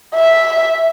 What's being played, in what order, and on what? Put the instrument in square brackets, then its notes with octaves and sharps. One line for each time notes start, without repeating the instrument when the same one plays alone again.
[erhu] E5